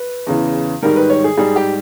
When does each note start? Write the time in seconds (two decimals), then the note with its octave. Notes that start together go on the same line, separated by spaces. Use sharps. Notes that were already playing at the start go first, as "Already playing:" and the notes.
Already playing: B4
0.27 E2 C#3 E3
0.83 G#2 D#3 G3 A#4
0.96 B4
1.10 C#5
1.24 G#4
1.38 G#2 G3 G#4
1.56 G4